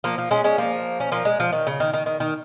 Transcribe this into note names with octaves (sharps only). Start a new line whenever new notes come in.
F3 A#3
F3 A#3
G#3 C#4
G#3 C#4
F3 A#3
C#4
F3 A#3
G#3
F3
D#3
C#3
D#3
D#3
D#3
D#3